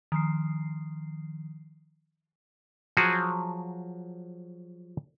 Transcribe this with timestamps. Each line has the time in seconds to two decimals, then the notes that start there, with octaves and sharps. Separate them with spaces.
0.12 D#3 F3 C7
2.97 F3 F#3 F#4 G#4